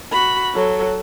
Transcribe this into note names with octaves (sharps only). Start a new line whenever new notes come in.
F#4 B5
F#3 A4